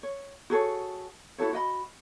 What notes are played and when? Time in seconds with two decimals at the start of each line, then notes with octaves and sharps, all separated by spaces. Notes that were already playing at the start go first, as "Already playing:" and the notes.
0.03 C#5
0.50 F#4 G#4 A4 C#5
1.38 E4 F#4 A4 C#5
1.53 F#4 D#5 B5